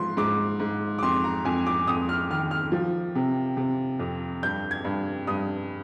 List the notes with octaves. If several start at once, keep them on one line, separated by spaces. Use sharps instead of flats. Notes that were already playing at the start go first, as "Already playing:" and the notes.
Already playing: G#2 F3 C6
G#2 D6
G#2
D6
F2 C6
A#5
F2 G#5
D6
F2 D#6
F6
D#3 F6
F6
F3
C3
C3
F2
G2 G6
G#6
G2
G2 D#6